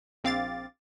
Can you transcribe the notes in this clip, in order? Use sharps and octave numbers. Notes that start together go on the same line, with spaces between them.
A#1 C4 F5 D6 A6